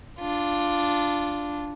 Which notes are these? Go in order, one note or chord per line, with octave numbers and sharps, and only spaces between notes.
D4 F4